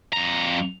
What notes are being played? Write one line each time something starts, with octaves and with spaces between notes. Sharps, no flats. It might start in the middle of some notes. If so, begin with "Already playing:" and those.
F2 A#5